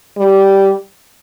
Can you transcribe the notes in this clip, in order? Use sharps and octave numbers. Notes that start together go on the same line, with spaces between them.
G3